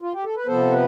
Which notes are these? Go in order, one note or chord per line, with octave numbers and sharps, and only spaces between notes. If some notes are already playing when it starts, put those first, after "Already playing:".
F4
G4
A4
B4
C3 F3 B3 A4 C5
B4